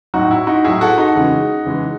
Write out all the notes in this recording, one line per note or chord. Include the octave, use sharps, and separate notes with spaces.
A2 F#3 D#4 F#4
E4
D#4 F#4
A2 F#3 E4 G#4
F#4 A4
D#4 F#4
C#3 E3 G#3
C#3 E3 G#3